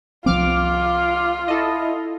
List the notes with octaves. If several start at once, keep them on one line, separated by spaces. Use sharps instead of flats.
C2 F3 C4 F4 D6 F6
E4 A4 D#5